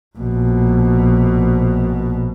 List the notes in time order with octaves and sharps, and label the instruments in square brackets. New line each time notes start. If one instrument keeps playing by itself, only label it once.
[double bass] A#1 B2